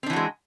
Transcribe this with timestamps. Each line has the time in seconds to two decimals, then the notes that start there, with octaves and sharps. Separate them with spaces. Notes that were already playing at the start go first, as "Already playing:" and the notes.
0.03 C4
0.06 D4
0.10 E3
0.13 F#4
0.16 G#3